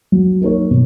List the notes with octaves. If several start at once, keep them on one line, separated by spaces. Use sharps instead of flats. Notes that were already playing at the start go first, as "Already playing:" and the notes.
F#3
A#3 D#4 A#4 C#5
B2